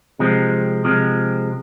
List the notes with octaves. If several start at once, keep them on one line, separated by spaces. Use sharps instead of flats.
C3 F3 G#3 C4
C3 F3 G#3 C4